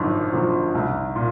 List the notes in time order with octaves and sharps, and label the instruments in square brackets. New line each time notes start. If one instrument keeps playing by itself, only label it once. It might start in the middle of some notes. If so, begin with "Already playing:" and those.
Already playing: [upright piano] G#1 F#2 D3 F3
F#2 D3 F3
C2
A#2